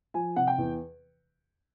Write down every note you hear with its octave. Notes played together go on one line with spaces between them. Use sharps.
F3 G#5
C3 F#5
G5
E2